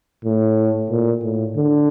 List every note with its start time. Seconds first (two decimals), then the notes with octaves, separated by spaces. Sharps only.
0.25 A2
0.90 A#2
1.23 A2
1.57 D3